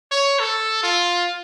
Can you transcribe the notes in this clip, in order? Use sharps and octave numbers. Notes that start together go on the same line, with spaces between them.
C#5
A4
F4